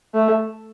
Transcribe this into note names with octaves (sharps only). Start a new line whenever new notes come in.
A3